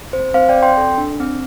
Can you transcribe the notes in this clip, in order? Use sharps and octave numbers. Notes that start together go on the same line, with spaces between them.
C4 C5
C4 C5 F5
D5 G5
C4
G5 C6
A4
D4
C4